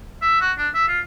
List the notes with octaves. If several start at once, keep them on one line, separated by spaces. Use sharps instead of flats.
E5
F#4
D4
E5
F4